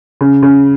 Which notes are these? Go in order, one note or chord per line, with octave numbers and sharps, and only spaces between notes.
C#3
C#3